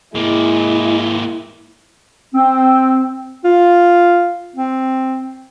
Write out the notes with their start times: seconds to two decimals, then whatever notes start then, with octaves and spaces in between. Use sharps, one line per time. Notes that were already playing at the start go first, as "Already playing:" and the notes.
0.15 G#2 G#3 A#3 E4
2.34 C4
3.45 F4
4.56 C4